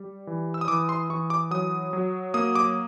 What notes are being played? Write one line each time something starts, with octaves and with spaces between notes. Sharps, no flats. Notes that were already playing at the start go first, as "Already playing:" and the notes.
Already playing: G3
E3
E6
D#6
E3 D6
C6
E3 C#6
D6
F#3 D#6
F#3
A#3 D#6
D6